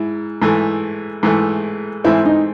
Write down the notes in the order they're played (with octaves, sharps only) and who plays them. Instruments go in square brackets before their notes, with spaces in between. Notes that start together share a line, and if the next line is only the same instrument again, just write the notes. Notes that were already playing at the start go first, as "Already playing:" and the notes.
Already playing: [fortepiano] G#2 [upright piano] E4
[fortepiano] G#2 E3 A3
G#2 E3 A3
[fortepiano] G#2 E3 A3 C4 [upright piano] E4
[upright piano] D#4